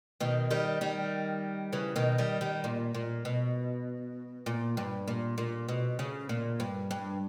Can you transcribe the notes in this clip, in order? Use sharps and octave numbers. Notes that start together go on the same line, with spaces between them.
B2 D#3
D#3 G3
D#3 G3
C#3 E3
B2 D#3
D#3 G3
D#3 G3
A#2
A#2
B2
A#2
G2
A#2
A#2
B2
C#3
A#2
G2
G2